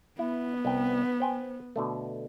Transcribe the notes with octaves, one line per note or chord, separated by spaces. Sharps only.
B3 E4
C2 G5
C5 G5 G#5
B2 D3 A3